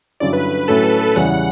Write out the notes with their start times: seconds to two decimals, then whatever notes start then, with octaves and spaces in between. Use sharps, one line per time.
0.20 G2 D3 F#3 C#4 E4 D5
0.33 B4
0.68 A2 F#3 C#4 E4 A4
1.16 E2 C#3 G3 C#4 E4 F#5